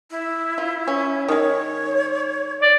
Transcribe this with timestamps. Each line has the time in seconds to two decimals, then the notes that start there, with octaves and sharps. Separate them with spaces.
0.11 E4
0.58 F4
0.87 C#4
1.28 D#3 G#3 C#5
2.62 D5